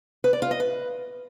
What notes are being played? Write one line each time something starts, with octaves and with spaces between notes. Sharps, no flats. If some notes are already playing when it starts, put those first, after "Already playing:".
B4
D5
F4
D#5
B4